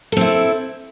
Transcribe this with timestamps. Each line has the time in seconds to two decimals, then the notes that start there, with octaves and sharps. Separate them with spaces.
0.12 A4
0.17 C4
0.21 E4